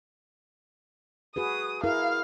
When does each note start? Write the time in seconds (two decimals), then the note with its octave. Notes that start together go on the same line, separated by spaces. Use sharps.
1.36 F#4 G#4 B4 D#6
1.84 E4 G#4 A#4 F5